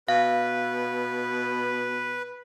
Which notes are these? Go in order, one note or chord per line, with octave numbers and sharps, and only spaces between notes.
B2 B4 F5